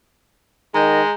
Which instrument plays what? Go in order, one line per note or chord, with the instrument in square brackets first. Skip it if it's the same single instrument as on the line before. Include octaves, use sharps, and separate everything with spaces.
[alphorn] D#3 [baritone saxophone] G#3 [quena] D#5 [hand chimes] A#5 G6